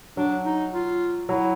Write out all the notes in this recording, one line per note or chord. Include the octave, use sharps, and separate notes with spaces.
F#3 D4
D#4
F4
F#3 E4